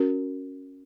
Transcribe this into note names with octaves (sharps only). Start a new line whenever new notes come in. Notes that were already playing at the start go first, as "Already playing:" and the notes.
Already playing: C#4 F#4 A#4